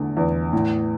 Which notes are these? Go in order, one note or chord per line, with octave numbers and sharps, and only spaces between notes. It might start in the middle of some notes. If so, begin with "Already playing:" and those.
Already playing: E2 D3 A3
E2
A2